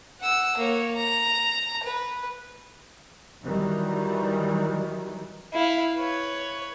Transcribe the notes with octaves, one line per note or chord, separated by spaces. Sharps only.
F#5 E6
A#3 C#5
A#5
B4
D#3 E3 F#3 G3
E4 F5
B4 C#5